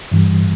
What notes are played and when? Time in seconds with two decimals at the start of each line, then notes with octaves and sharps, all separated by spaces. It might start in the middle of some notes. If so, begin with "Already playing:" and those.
0.11 G2 E3 G3